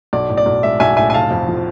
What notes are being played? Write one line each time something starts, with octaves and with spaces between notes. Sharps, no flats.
B1 D5
A2
D5
B1
G#3 E5
B1 E5 G#5
A2 E5 G#5
G#5
F1 F5 A5
F2
F3